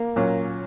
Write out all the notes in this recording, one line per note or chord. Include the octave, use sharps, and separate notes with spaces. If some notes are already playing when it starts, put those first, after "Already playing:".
Already playing: A#3
A#2 F#3 C#4